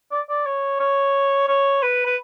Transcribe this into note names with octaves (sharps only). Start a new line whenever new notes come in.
D5
D5
C#5
C#5
C#5
B4
B4